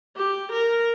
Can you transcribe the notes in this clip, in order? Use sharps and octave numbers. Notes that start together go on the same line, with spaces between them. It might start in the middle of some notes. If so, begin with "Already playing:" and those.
G4
A#4